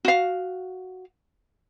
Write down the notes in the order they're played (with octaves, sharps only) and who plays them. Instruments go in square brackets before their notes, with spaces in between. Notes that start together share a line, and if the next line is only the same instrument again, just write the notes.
[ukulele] F#4 F5